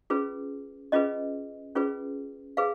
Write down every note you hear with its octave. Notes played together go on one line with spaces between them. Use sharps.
C#4 F4 G#4 B4
C#4 F4 G#4 B4 D#5
C#4 F4 G#4 B4
G#4 B4 F5